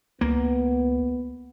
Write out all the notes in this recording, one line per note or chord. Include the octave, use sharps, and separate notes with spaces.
C#2 A#3 B3